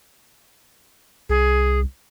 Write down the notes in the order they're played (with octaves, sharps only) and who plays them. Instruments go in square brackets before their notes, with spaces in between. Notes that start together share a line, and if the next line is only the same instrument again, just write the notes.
[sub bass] C2 [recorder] G#4